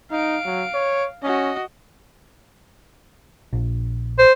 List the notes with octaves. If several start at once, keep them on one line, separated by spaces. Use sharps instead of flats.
D#4 F5 D7
F#3
C#5
C#4 F#4 D#5
A#1
C5